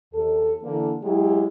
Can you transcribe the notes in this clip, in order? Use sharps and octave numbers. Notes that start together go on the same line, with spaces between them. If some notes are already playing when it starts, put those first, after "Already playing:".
D#2 A4
D3 E3 A#3
F#3 G#3 E4 G4